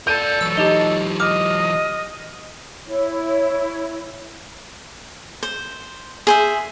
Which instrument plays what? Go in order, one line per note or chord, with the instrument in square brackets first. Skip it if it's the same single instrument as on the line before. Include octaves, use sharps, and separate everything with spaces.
[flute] A4 [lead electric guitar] A#4 D5 [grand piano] G6 D#7
[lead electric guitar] E3 F#3 [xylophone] E6
[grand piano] D#4 [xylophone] G4 F7 G7
[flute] D#5 [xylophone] D6 [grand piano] F6
[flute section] E4 C#5
[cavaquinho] C5
G#4 C5 E5